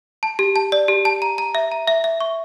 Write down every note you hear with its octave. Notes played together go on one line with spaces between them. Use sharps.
A5
G4
A5
D5
G4
A5
A#5
A#5
E5
A#5
E5
E5
C#6